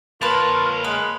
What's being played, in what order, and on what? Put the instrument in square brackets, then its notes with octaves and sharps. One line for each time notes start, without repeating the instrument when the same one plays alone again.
[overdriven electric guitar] A#3 C#5 [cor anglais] F4 [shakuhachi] A#4 [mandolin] B4 A5
[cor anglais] G#3 [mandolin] B4